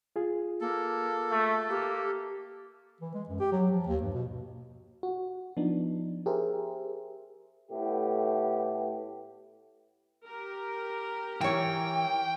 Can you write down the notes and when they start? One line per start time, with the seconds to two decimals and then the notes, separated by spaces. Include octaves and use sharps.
0.16 F4 G#4
0.61 A#3 A4
1.32 A3
1.70 A#3 G4
3.01 E3
3.14 G#3
3.29 F#2
3.40 G4
3.52 F#3
3.71 F3
3.87 D#2
4.01 G2
4.14 B2
5.03 F#4
5.57 F3 B3 D4 D#4
6.26 G4 G#4 A#4 C5 E5
7.70 A2 A3 B3 G4
10.26 G4 A#4
11.41 E3 C#5 G5